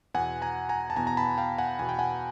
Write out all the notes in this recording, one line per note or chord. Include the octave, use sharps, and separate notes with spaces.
E2 B2 F#5 G#5
G#5 A#5
G#5 A#5
A5
E2 B2 G#5 A#5
A#5
A5 B5
F5 G5
F#5 G#5
E2 B2 G#5
G5
F#5 G#5